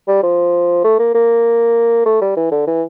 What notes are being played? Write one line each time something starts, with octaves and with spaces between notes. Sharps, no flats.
G3
F3
A3
A#3
A#3
A3
G3
E3
D3
E3